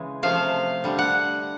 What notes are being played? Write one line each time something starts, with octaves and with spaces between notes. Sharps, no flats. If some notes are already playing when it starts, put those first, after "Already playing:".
Already playing: C#3 E3 G#3
C3 F3 A3 F5
D3 G3
F#5